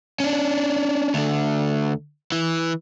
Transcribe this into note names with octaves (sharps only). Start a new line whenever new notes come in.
C#4 D4
D2 D3
E3